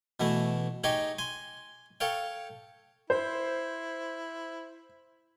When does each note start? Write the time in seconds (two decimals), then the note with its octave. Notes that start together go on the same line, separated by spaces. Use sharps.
0.20 B2 E3 A3 E4
0.84 D#4 G4 G#4 C#5 D#5 G5
1.19 G#5 C6
2.00 A4 C#5 F5 G5
3.10 E4 C5